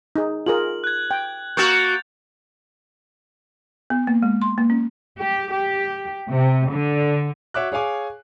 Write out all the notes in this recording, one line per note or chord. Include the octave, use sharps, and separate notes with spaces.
D#4 G#4
F4 G#4 A#4 F#7
F#6 G#6
G5
A#3 F#4 C#6 E6 G6 A6 F7
B3
A#3
G#3
C6
A#3
C#4
G4
G4
C3
D3
F#4 C#5 E5 D6 F#6
G#4 C#5 F5 G#5 D6